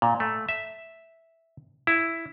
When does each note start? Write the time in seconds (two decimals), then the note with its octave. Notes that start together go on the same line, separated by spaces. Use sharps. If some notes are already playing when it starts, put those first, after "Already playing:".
0.02 A#2
0.20 A3
0.49 E5
1.87 E4